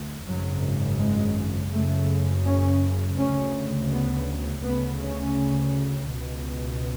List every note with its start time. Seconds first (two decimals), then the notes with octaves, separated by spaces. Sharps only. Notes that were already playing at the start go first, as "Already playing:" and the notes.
Already playing: D2
0.26 G#1 F#2 C#3 F#3
0.98 G#3
1.71 F#1 F#2 C#3 A3
2.44 C#4
3.17 D2 C#3 C#4
3.90 B3
4.64 D2 C#3 B3
5.00 C#4
6.10 C#2 B2